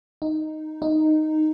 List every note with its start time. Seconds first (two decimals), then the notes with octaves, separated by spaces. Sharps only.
0.22 D#4
0.82 D#4